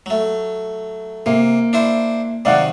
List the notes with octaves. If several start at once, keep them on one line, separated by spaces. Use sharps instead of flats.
F#3 A3
C3 A#3
D4 E4 C5
C3 D#3 F#3 D5 F5 F#5